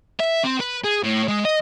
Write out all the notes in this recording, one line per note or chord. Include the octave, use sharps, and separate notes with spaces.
E5
C4
B4
G#4
A2
G#3
D#5